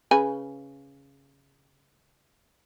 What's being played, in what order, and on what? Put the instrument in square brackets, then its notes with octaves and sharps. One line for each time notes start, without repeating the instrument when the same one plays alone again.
[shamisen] C#3 B4 G#5